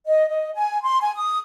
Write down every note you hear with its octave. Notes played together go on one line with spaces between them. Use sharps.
D#5
D#5
G#5
C6
G#5
D#6